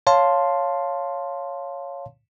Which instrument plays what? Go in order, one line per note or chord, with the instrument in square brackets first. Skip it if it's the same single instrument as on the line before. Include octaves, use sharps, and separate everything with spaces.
[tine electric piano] C#5 F5 A5 C6